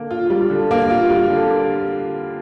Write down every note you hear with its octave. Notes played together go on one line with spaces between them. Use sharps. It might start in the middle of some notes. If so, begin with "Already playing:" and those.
Already playing: D3 A#3
F4
G3
D3
A#3
F4
G3
D3
A#3